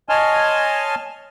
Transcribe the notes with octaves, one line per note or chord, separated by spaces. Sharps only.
C#5 D#5 G#5 A5 C6 F6